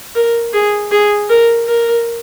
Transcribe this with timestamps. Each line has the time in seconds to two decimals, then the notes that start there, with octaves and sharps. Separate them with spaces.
0.15 A#4
0.53 G#4
0.91 G#4
1.30 A#4
1.68 A#4